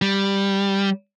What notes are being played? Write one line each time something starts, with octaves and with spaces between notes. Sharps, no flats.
G3